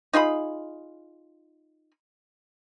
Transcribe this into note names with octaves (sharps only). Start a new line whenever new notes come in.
D#4 F4 G#4 B5